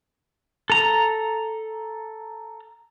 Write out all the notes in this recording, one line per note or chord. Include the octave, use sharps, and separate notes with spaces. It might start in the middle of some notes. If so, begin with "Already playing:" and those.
A4 A#5